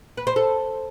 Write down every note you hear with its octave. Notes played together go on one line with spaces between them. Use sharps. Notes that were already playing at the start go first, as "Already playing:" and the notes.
B4
C5
A4